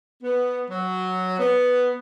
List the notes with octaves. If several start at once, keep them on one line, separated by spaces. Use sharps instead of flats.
B3
F#3
B3